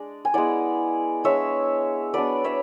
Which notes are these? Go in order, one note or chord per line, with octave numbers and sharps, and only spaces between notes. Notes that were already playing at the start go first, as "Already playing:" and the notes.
Already playing: G#3 D4 D5
G#5
G#3 B3 E4 D5 F#5
G#3 D4 C#5 E5
F#3 B3 D4 B4 D5
C#5 E5